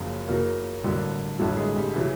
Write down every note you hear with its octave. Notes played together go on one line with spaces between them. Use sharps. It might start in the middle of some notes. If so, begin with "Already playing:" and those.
Already playing: F#1 F#2 C#3 F3 F#3 F4
F#1 F#2 C#3 F#3 A#3 A#4
A1 G2 D3 F#3
A1 G2 D3 F#3 A3 A4
G#3 G#4
G3 G4
C#3 E3 F#3 E4